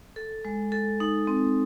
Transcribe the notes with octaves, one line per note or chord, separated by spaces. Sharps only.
A4
G#3
A4
D#4
C4